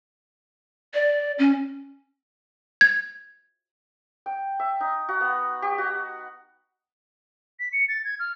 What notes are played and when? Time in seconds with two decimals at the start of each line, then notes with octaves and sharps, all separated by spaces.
0.94 D5
1.39 C#4
2.81 G#6
4.26 G5
4.60 E5
4.81 D#4
5.09 F#4
5.21 B3
5.62 G4
5.78 F#4
7.59 B6
7.72 C#7
7.88 A6
8.05 G#6
8.19 F6